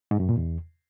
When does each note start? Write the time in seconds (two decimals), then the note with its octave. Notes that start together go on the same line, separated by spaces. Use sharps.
0.11 G#2
0.20 F#2
0.29 A#2
0.38 E2